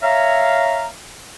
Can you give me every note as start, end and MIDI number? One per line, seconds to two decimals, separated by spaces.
0.02 0.87 73
0.02 0.87 76
0.02 0.87 77
0.02 0.87 82